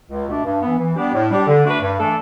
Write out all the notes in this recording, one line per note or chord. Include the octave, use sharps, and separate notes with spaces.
C#2
B2 A3 D4
G2
E3 B3
E3
G3 B3 D4 G4
A2
G3 D4 G4
D3
A3 D4 F#4 B4
G2
E3 A3 D4 A4